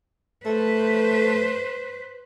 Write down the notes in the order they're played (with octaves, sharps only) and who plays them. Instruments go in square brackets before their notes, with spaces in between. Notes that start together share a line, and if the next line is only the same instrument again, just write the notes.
[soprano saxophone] A3 [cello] B4 C5